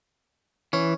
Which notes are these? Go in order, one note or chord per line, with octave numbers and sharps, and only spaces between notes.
E3 C#4